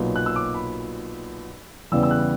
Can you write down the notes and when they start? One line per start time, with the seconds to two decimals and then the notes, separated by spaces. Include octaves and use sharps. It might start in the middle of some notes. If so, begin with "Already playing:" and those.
Already playing: B1 A#2 F#3
0.16 F#6
0.26 E6
0.36 D6
0.55 B5
1.92 E2 C#3 E3 G3 E6
2.03 E6
2.11 F#6